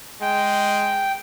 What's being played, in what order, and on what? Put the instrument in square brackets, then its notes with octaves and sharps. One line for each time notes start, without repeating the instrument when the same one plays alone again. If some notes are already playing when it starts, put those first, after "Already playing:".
[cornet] G#3 [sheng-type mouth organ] G5